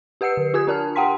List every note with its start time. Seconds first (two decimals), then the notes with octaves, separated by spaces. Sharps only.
0.21 G4 B4 F#5 E6 C7 C#7
0.37 D3
0.54 F4 G4 G#5 D#6 G#6
0.67 D4 A#4 A5 F6
0.96 G4 F#5 G5 A5 C6 B6